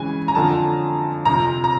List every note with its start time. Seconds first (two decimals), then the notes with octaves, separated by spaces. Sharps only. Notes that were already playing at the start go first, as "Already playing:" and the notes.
Already playing: C#3 E3 G#3 G#5
0.28 A#5
0.35 F2 D3 F3 A5
1.25 F2 C3 F3 A#5
1.64 A#5